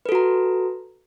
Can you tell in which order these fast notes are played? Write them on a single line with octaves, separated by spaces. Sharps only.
B4 A4 F#4 A#5